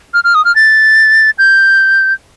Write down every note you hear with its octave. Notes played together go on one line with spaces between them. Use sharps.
F6
F6
D#6
F6
A6
G6